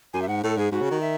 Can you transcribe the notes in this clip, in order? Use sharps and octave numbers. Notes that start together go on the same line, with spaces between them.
F#2 G#5
E5
G#2 F#5
A2 A4
G#2 G#4
G#2 F#4
C#3
D#3
E5